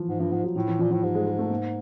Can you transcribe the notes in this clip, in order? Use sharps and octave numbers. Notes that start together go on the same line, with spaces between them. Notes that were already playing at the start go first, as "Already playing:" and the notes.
Already playing: E3 F3
G#2
G2 F3
G#2 F3
F#3
A2 F3
E3
F3
A#2
A2 F3
G#2 G3
G#3
G#3
A3
A#3